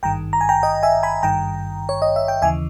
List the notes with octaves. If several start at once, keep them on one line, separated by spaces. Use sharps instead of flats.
G#1 G2 D#3 G5 A#5
A#5
G#5
G5 A#5
D#5 G5
E5 G#5
G#5 B5
G#1 G2 D#3 G5 A#5
C#5
D#5
E5
G5
D#2 C#3 E3 E5 G#5